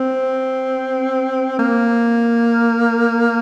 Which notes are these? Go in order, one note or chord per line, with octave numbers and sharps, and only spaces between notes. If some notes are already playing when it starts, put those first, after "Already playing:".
Already playing: C4
A#3